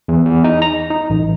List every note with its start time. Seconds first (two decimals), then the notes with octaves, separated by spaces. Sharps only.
0.08 E2
0.26 E2
0.44 D#4
0.62 A#5
0.90 D#4
1.10 A1